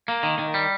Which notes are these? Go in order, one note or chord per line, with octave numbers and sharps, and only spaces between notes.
A#3
D#3
D#3
G3